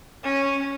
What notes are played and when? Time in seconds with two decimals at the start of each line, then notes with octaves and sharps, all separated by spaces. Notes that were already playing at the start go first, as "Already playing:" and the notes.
0.23 C#4